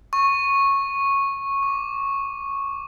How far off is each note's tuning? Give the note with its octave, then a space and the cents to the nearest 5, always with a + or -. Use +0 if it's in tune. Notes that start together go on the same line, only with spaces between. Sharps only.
C#6 -10
D6 -25